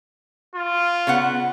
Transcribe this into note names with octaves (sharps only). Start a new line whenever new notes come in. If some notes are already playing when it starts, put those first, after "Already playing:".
F4
C#3 B3 F#5